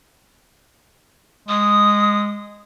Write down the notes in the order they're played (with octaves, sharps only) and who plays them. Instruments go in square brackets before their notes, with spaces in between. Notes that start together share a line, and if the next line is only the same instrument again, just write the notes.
[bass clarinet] G#3 [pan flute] D#6